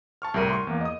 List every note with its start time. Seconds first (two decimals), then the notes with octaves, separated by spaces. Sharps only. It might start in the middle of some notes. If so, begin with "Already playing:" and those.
0.22 A5 C#6 F6
0.34 C2 A2 G3 A#4 F6 D#7
0.50 C6 C#6
0.67 E2 A#3
0.81 D#5 D#6